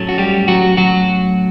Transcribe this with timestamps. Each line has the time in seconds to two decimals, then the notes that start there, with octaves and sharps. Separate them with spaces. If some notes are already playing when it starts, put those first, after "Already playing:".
Already playing: A2 F#3 A3 C#4
0.09 F#4
0.18 G3 G4
0.48 F#3 F#4
0.77 F#3 F#4